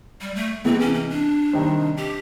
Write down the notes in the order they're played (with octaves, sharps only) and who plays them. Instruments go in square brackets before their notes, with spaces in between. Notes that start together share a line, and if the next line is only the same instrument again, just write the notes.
[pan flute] G3
A3
[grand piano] C3 E3 G#3 B3 E4 [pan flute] C4
[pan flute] C#4
C#4
D4
[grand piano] C3 D#3 G3 C4 D#4
[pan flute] G4